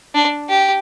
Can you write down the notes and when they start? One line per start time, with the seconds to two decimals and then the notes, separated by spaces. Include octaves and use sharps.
0.15 D4
0.49 G4